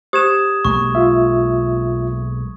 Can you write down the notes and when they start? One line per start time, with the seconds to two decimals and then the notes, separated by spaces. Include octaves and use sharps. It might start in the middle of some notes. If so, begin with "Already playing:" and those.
0.13 G4 C5 D#6 G#6 E7
0.65 B1 G#3 A#3 C#6
0.95 F4 E5